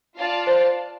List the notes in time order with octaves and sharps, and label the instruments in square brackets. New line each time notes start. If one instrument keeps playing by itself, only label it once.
[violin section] F4 D5 F5 A5
[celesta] C5